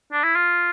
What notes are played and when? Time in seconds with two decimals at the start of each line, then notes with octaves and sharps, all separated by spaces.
0.12 D4
0.24 E4
0.35 F4